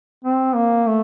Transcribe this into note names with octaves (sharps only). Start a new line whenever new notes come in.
C4
A#3
A3